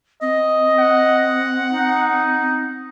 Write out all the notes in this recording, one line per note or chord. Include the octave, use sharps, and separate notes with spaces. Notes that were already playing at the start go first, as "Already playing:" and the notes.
C4 D#5
F#5
D#4